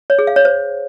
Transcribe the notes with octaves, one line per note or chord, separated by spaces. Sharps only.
C#5
G#4
F5
C#5
C5